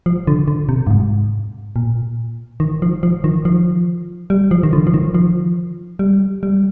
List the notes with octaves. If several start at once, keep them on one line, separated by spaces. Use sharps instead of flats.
F3
D3
D3
C3
G2
G#2
A#2
D#3
F3
F3
D#3
F3
G3
F3
D#3
D3
F3
D#3
F3
G3
G3